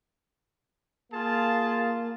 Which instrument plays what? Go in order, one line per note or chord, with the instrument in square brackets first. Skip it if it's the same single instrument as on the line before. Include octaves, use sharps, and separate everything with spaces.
[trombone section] A#3 [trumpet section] F4 G#4 A5